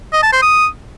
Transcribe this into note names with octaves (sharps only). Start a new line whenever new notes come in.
D#5
A5
C5
D#6